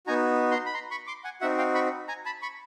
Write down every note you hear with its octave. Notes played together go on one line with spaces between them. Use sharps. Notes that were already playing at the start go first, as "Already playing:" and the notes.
B3 D#4 F#4 G#5 A#5
A#5 C6
B5
A#5 C6
B5 C#6
C6 D6
F#5 G#5
C4 D#4 F#4 E5 F#5
F5 G5
B5 C#6
G#5 A#5
A5 B5
B5 C#6